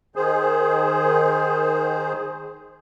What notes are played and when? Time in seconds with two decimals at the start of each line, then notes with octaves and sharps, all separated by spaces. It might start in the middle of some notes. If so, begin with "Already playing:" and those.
0.16 D#3 G#4 C5